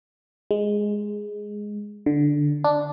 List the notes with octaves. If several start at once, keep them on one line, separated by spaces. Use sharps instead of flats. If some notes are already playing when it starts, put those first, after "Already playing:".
G#3
D3
D4